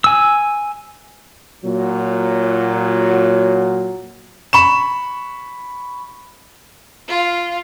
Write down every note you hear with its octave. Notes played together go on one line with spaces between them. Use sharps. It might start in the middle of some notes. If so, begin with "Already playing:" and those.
G#5 E6
A#2 F#3
B5 C#6 E7
F4